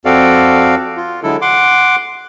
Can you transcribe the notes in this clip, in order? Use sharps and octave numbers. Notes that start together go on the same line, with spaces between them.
F2 C4 F#4 A4 D5 F5
F4
D3 F#3 G#3 E4 A4
F#5 C6 D6